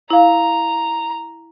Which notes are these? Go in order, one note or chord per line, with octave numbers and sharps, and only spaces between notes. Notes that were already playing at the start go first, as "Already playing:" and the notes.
E4 F5 A#5